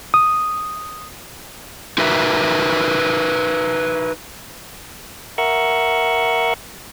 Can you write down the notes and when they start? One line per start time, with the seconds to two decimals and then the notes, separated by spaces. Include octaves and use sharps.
0.14 D#6
1.98 D#4 F#4 A#4 B4 E5
5.38 A#4 E5 F#5 C#6